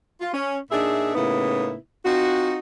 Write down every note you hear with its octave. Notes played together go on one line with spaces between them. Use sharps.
F4
C#4
A#2 D4 D#4 G#4 E5
A2 C#3 A#3 B3 D#4 E4
C4 D#4 F4 F#4